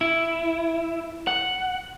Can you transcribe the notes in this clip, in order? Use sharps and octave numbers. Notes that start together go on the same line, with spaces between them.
E4
F#5